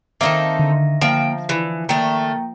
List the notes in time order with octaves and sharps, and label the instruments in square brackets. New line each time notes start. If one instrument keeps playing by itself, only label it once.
[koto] D#3 A#3 [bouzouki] C4 D#4 A4 [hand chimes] E5 A#6
[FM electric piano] D3
[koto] F3 [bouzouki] A#3 G5
[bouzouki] E3
[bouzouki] D#3 A3 [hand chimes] A#3 G5 A#5